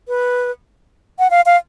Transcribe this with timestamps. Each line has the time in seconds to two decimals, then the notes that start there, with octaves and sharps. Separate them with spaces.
0.08 B4
1.19 F#5
1.31 F5
1.46 F5